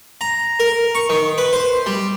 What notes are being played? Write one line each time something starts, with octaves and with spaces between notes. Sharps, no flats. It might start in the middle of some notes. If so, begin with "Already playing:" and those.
A#5
A#4
C#6
D#3
B4
C5
G3